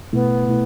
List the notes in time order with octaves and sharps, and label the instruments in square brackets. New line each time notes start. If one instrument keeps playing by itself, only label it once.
[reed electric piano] B2 A3 E4 [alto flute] B3
[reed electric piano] B2 A3 E4